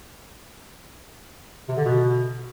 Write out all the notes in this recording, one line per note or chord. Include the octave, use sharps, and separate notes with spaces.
C3
D3
B2